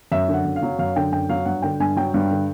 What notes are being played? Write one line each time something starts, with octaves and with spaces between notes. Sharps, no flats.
F#2 E5
D3
F#5
F#2
F5
F#3
F#2 F5
D3 G5
F#2 G5
F#3 F5
G2 F#5
D3 G5
G2 G#5
F#3 G5
G2
D3